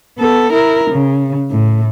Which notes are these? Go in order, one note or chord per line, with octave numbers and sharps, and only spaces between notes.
B3 A4
E4 A#4
C#3
A2